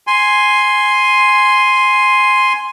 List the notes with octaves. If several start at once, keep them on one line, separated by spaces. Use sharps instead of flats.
G#5 C6